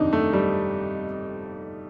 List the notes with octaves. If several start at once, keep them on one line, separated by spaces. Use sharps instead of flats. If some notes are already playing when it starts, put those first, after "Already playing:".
Already playing: G1 F2 C3 D#3 D4 D#4
A3
G3